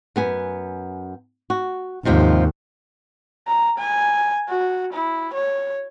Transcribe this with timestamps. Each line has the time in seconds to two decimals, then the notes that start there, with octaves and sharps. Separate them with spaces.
0.16 F#2 B3 G#5
1.50 F#4
2.05 D#2 G#2 C3 F3
3.48 A#5
3.78 G#5
4.49 F#4
4.92 E4
5.34 C#5